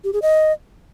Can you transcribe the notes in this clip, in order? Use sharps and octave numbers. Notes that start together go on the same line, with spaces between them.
G4
G#4
D#5